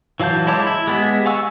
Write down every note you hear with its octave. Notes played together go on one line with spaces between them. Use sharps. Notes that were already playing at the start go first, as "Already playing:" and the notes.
E3 F#3 F5 A5 G6
G#3 E4 C#5 A5 D6
E4
G#3 B3 G4
F5 F#5 G#5 C#6 E6